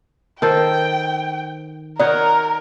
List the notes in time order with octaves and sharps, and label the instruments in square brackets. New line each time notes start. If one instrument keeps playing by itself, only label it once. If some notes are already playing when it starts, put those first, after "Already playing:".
[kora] D#3 A4 C5 [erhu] G5
[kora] D#4 F#4 C#5 [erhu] A#4 [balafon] D5